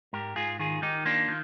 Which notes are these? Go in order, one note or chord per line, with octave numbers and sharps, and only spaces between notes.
G#2 G4 A#4
G#2 F4 G#4
D#3 F4 G#4
D#3 D#4 G4
A#3 D4 F4
D#3